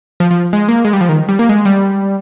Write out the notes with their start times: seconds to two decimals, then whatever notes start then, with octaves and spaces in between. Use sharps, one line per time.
0.20 F3
0.31 F3
0.53 G#3
0.68 A#3
0.85 G#3
0.93 G3
1.01 F3
1.09 D#3
1.28 G3
1.39 A#3
1.49 G#3
1.65 G3